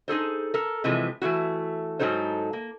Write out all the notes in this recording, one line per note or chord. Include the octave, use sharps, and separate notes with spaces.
D#4 G#4 A4 C5
A4 A#4
C3 E3 F3 G#3
E3 A3 E4 F#4
G#2 D#3 F#3 D#4 A4 C5
A#3